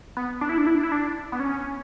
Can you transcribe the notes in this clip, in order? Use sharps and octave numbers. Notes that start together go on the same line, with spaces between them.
B3
D4
E4
D4
E4
D4
E4
D4
B3
C#4